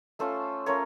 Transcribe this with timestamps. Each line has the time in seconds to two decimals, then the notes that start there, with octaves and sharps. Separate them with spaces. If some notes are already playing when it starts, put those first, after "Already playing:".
0.19 A3 C#4 F4 A4 C5
0.66 A3 C#4 F4 A#4 C#5